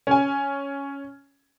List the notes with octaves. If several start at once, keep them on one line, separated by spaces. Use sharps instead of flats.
C#4 G#5